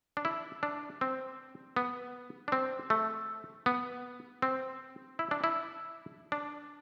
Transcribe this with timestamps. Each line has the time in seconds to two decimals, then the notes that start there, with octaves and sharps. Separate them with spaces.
0.17 D4
0.25 E4
0.63 D4
1.01 C4
1.76 B3
2.48 D4
2.52 C4
2.90 A3
3.66 B3
4.42 C4
5.19 E4
5.31 D4
5.44 E4
6.32 D4